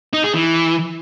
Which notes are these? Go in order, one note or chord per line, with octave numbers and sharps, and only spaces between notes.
D#4
G#4
E3